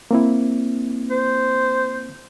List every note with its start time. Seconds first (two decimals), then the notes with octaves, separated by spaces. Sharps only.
0.11 A#3 C4 E4
1.10 C5